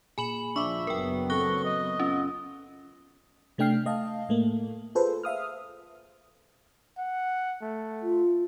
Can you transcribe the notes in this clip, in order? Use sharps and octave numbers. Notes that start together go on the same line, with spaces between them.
A#2 G#4 G#5 B5 F#7
F3 D4 E5 C#6 D6
F#1 F#3 B3 A#4 G5
C4 A4 C#6 F#6 A#6 G7
D#5
C#4 F4
C3 A3 D4 G5 F6 C7
A3 D#5 F5 A5
A2 A3 A#3
F4 G#4 A4 B4 C5
E5 F5 D#6 F6
F#5
A3
F4